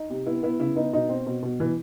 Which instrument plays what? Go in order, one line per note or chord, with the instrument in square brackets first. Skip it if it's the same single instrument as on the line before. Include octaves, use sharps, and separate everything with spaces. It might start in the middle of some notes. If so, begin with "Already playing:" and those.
Already playing: [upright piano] D#4
C3
B3 E4
B3 E4
C#3 E4
B3 D#4
B2 D#4
C4
B2
B2
E3